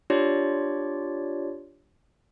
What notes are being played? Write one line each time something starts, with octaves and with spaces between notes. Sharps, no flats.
D4 F4 G4 C#5 D5